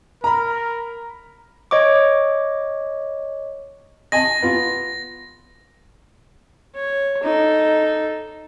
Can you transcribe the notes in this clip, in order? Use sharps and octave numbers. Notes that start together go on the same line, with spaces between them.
A#4 A#5 B5
C#5 D#5 C#6 D6
D#5 G#5 A5 A#6
B3 F4
C#5
D#4 A4